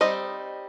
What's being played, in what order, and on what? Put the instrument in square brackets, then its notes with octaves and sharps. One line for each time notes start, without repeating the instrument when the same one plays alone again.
[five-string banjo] G3 C4 D#4 D#5